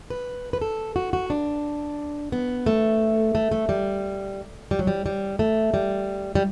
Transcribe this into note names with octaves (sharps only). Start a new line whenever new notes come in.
B4
B4
A4
F#4
F#4
D4
B3
A3
A3
A3
G3
G3
F#3
G3
G3
A3
G3
G3